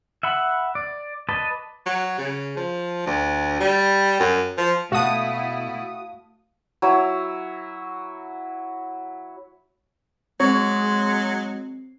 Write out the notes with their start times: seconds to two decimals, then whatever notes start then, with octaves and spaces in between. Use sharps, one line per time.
0.23 E5 F#5 B5
0.75 D5
1.29 B4 D5 D#5 A5
1.86 F#3
2.18 C#3
2.57 F3
3.06 D2
3.60 G3
4.20 F#2
4.58 F3
4.92 B2 A3 E4 F#4 F5 A5 D#6
6.82 F#3 E4
10.40 F#3 G#3 C4 C#5